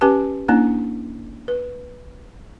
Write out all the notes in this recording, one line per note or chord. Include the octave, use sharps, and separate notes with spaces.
C#4 G4 B4 A5
A#3 C#4 D4 E4
B4